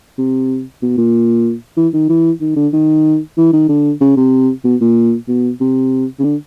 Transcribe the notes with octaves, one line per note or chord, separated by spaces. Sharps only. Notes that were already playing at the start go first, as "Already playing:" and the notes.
C3
B2
A#2
E3
D#3
E3
D#3
D3
D#3
E3
D#3
D3
C#3
C3
B2
A#2
B2
C3
C#3
D3